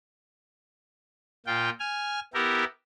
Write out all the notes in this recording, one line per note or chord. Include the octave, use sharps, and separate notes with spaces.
A#2 F4 G5
G#5 F6
B3 E4 G4 A#4